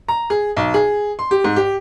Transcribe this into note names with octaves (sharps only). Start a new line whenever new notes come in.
A#5
G#4
B1
G#4
C6
G4
G#2
G4